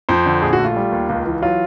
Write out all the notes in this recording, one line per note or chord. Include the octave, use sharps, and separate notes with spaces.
F2 C5
D3
A#1 G#4
F#4
A3
F4
G3
D#2
C#2
E3
F#3 F4